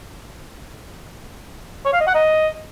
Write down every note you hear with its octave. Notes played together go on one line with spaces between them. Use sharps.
C#5
F5
D#5
F#5
D#5